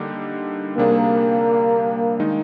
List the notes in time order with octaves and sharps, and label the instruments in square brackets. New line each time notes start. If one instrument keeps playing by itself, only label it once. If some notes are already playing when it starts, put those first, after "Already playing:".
Already playing: [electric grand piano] D3 G3 A#3 D#4 G4
[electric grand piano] C3 G3 D4 G#4 [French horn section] A#3
[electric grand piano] D#3 G#3 D#4